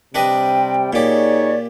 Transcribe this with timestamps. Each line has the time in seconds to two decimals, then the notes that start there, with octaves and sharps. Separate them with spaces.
0.15 C3 G3 D4 B4 D#5 G5
0.93 A#2 D#4 G4 G#4 C#5 D5